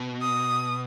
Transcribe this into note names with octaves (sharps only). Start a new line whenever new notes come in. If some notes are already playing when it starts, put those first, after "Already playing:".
Already playing: B2
D#6